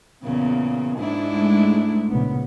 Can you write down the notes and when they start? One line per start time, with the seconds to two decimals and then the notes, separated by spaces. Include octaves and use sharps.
0.24 E2 A#2 C#3
0.99 G#2 D4 E4
1.33 G#3 A3
2.09 A#1 C#3 B3